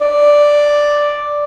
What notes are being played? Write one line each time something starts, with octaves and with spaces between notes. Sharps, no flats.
D5